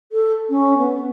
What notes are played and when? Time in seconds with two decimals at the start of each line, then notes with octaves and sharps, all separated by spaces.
0.12 A4
0.49 C#4
0.77 B3